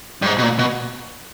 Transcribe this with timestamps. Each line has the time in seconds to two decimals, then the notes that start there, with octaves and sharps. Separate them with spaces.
0.22 G2
0.26 G#2
0.38 B2
0.43 A#2
0.59 B2